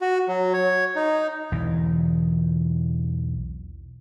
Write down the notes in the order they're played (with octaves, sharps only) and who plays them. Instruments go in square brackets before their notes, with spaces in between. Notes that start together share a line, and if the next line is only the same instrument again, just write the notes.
[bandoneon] F#4
F#3
C#5
D#4
[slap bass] B1 E2 E3